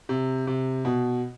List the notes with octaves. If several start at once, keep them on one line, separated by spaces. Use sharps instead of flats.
C3
C3
B2